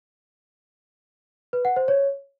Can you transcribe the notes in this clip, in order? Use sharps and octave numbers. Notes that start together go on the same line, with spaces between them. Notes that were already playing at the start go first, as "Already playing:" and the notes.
B4
F#5
C5
C#5